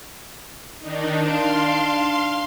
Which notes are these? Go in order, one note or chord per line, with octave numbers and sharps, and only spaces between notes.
D#3 D4 D#4
D4 F5 C6